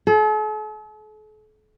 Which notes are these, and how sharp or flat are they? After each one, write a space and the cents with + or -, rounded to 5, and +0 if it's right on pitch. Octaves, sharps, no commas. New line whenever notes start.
A4 -45